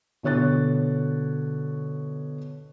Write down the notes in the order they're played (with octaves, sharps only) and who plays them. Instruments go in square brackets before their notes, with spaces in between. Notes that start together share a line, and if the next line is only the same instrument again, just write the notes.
[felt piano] B2 D3 C#5 F#6 A6